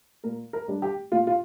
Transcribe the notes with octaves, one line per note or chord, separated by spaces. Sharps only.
A#2 A#4
A#4
G3 D4
G4
A#2 F4
F4